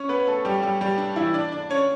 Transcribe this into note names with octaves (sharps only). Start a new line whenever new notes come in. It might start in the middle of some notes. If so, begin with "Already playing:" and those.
Already playing: C#4 C#5
B3 B4
A3 A4
G3 G4
G3 G4
G3 G4
D4
E3 E4
D4 D5
D4 D5
C#4 C#5